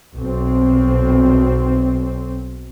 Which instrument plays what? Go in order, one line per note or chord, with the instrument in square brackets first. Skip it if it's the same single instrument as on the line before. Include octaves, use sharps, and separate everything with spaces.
[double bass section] B1 C4